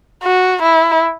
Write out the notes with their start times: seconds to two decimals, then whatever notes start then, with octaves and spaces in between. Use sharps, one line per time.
0.23 F#4
0.62 E4